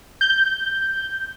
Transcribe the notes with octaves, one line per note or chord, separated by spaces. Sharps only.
G6